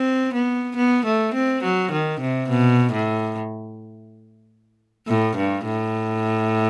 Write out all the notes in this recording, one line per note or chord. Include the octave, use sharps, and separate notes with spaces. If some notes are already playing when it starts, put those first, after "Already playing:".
Already playing: C4
B3
B3
A3
C4
F#3
D#3
C3
B2
A2
A2
G2
A2